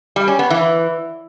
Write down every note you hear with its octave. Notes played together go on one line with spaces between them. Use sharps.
G3
C#4
B3
E3